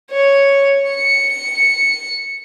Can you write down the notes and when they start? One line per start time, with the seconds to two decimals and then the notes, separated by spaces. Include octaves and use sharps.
0.11 C#5
0.90 C#7